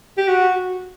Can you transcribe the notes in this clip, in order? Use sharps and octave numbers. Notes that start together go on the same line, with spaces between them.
G4
F#4